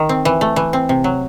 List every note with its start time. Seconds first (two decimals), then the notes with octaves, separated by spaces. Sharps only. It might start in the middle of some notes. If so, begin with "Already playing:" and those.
Already playing: D#3
0.09 C4
0.25 E3
0.41 A3
0.56 E3
0.73 C4
0.89 C3
1.04 F#3